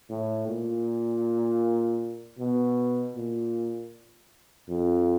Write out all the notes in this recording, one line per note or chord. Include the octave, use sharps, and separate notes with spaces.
A2
A#2
B2
A#2
F2